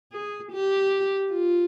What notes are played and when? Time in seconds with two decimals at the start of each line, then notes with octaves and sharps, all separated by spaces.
0.13 G#4
0.52 G4
1.31 F4